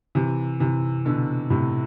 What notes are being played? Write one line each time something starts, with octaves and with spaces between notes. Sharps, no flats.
C3 E3
C3 E3
B2 D3
A2 C3